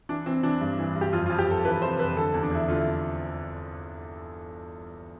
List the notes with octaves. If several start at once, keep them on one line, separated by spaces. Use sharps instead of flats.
E3 D4
E3 C4
E3 D4
G2
E3
G2
G4
F2 F4
F4
F2
G4
F2 A4
E3 B4
C3 C5
F2 B4
D3 A4
E2
D4
E2 E4
D3 F4
E4